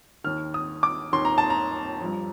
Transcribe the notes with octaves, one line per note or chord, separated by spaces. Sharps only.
D#2 D#3 F6
D#6
D6
D#2 D#3 C6
A#5
A5
A#5
G2 F3